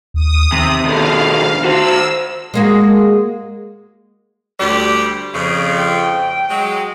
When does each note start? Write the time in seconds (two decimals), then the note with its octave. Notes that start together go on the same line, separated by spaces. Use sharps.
0.14 D#2 D#6
0.52 C3 D#3
0.85 B2 D3 F5
1.65 F#4 C5 E6
2.54 G#3 A#3 F#4
4.59 D2 G3 G4
5.33 F2 C#3
5.77 G5
6.49 F#3 G#3